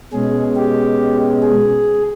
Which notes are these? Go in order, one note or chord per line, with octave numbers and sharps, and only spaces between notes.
B2 G#3 C#4 G#4
G4
G#4